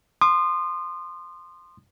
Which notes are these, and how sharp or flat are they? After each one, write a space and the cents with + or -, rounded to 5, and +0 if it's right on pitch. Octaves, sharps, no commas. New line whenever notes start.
C6 +0 D#6 -35